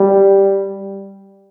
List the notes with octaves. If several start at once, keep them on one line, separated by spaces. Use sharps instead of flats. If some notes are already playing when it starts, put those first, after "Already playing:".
Already playing: G3